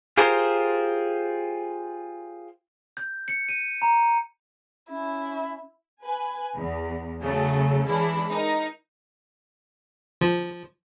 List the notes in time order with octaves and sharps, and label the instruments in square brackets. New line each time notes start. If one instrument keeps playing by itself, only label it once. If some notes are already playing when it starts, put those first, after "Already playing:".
[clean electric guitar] F4 G4 G#4 A#4 C5
[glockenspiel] G6
C#7
D#7
A#5
[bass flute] C#4 [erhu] E4
[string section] B4 G#5
E2
C#3 F#3 A3
E3 G#3 C#4 D4 E4
D#4 A#4
[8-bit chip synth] F3